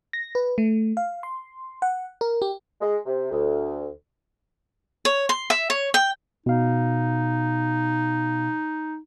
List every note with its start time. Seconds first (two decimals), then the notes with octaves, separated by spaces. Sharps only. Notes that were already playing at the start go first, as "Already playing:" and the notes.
0.13 A#6
0.35 B4
0.58 A3
0.97 F5
1.23 C6
1.82 F#5
2.21 A#4
2.42 G4
2.81 G#3
3.05 C3
3.31 D2
5.05 C#5
5.29 C6
5.50 E5
5.70 C#5
5.94 G5
6.46 B2 D#4 F5